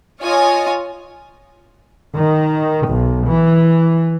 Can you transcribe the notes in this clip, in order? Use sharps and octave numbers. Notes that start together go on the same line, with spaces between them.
F4 C#5 D#5 G#5
D#3
B1
E3